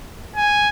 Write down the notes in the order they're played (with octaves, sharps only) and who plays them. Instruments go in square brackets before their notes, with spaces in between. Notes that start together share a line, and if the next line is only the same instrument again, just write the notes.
[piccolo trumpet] G#5